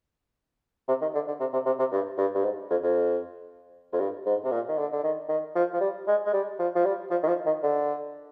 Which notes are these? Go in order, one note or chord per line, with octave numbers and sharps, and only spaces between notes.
C3
D#3
D3
D3
C3
C3
C3
C3
G2
G2
G2
G#2
F2
F2
F2
G2
G#2
C3
A#2
D#3
D3
D3
D#3
D#3
F3
F3
G3
G#3
G#3
G3
F3
F3
G3
F3
D#3
F3
D#3
D3